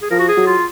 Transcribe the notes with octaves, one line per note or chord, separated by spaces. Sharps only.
G#4
F3 A#4
F#4
G#4
F#3
F4